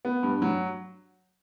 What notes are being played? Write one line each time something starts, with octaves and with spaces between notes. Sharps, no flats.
B3
G2
F#3